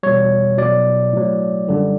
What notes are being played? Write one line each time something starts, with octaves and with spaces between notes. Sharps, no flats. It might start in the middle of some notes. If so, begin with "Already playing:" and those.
E2 B2 G3 C#5
B2 F#3 D5
A2 F#3
F#2 D3 G3